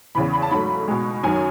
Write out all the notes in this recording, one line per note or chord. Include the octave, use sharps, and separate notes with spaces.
E2 C#3 E3 B5
B5
A5
G#2 F#3 A3 B5
B2 G#3
F#2 D#3 F#3 G#5